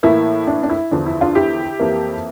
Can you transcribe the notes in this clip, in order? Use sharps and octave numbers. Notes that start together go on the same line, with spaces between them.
A2 E3 A#3 E4
D4
D4
E4
E2 D3 F3 D4
E4
D4 F4
E4 G4
F2 E3 A#3